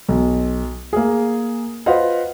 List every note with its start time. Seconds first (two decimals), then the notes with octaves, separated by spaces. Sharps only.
0.08 B1
0.93 A#3 G#4
1.86 F4 B4 C5 D#5 F5 F#5